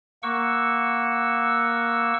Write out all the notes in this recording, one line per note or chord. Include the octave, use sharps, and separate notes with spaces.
A#3 F#5 C#6 E6